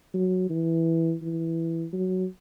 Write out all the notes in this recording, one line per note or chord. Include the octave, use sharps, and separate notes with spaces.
F#3
E3
E3
F#3